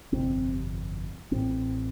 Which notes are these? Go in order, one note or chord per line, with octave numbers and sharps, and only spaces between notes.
G1 F2 C3 C4
A1 A2 C4